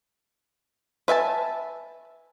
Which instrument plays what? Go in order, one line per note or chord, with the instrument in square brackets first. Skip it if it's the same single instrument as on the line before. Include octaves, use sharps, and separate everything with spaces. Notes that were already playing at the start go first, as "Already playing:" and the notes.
[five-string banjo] B4 E5 G#5 A5